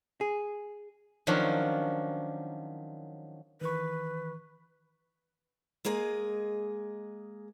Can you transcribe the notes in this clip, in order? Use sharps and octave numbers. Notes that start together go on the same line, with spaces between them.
G#4
D#3 F3 F#3 C#4 D4
D#3 E3 B4 C#6
G#3 A#3 G#4 D#5